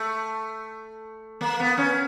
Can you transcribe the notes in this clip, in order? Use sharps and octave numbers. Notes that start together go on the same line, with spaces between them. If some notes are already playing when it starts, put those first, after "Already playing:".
Already playing: A3
A#3
B3
C#4